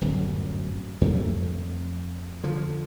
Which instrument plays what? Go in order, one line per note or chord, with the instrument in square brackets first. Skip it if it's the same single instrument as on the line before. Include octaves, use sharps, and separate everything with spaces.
[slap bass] D1 G1 F#2
F2 A3
D3 F3